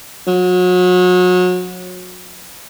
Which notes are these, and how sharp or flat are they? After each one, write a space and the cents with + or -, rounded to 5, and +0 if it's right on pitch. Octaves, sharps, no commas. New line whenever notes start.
F#3 -35